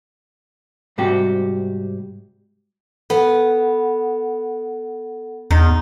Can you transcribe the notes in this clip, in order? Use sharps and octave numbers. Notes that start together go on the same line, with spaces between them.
G#2 C3 G3 F#4 G4
B3 A4 F#5
E2 D#4